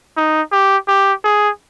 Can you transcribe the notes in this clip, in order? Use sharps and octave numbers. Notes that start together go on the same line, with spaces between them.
D#4
G4
G4
G#4